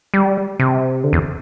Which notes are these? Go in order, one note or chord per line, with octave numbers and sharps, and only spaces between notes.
G3
C3
D3
E2